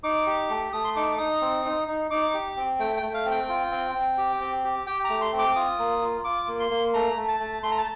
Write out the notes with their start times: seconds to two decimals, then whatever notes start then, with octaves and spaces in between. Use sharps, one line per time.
0.03 D#4 D6
0.27 G4
0.50 A3
0.73 A3 D#6
0.84 C6
0.96 D#4 D6
1.18 D#4 D#6
1.41 C4
1.65 D#4
1.88 D#4
2.11 D#4 D6
2.34 G4
2.57 C4
2.79 A3 G5
2.97 G5
3.02 A3
3.14 F5
3.26 C4
3.31 G5
3.49 F4
3.72 C4
3.95 C4
4.18 G4
4.40 C4
4.64 G4
4.87 G4 G5
5.04 A#5
5.10 A3
5.22 C6
5.33 C4
5.39 D6
5.56 F4 D#6
5.79 A#3
6.02 F4
6.24 F4 D6
6.48 A#3
6.60 C6
6.71 A#3
6.94 A3 A#5
7.17 A3
7.28 A5
7.40 A3
7.63 A3 C6
7.71 A#5
7.78 A5